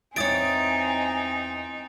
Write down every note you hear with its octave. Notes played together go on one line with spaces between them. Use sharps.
E2 C4 D#4 C#5 G#5 D#6 A6 D7